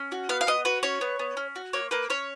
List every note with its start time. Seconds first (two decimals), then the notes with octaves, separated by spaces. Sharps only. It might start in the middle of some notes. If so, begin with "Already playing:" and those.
Already playing: C#4
0.12 F#4
0.29 B3 F5
0.41 F5
0.47 B3 D#5
0.65 F#4 B4
0.83 C#4 C#5
1.01 B3
1.19 B3
1.37 C#4
1.56 F#4
1.73 A#3 C#5
1.91 A#3 B4
2.10 C#4 C#5